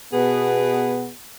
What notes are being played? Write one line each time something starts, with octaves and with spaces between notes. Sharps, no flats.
B2 B3 G#4